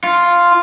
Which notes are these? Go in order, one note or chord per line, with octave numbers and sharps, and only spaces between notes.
F4